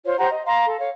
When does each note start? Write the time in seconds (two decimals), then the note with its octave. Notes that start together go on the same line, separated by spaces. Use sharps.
0.05 F4 C5 C#5
0.18 G4 C5 F#5 A#5
0.30 D#5
0.45 F5 A#5 C6
0.65 A4
0.80 C#5 F5